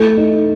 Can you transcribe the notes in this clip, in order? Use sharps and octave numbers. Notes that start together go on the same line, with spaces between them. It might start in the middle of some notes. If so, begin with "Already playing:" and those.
Already playing: A3 E4
D#4